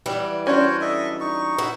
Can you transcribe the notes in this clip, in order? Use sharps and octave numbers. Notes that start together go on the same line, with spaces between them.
E3 F#3 G3
C#4 D4 F#4 C5 C#5
A4 D#5 E5
D#4 C#6
E4 F#4